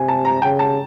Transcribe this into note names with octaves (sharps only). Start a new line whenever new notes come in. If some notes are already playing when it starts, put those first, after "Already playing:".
Already playing: C3 G#5
A5
A#5
C#3 G5
A5